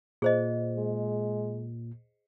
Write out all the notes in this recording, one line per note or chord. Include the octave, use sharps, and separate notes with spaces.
A#2 G#4 C5 D#5
G#3